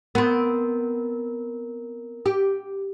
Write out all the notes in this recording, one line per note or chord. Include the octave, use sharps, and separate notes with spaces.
B3 C4 A#4
G4